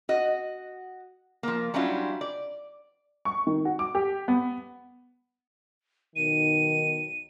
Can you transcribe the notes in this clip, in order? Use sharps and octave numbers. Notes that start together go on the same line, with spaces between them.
F#4 D#5
F3 A#3
F#3 G3 C#4 D4 E4 F4
D5
C#6
D#3
F#4
D6
G4
B3
B1 D#3 D#7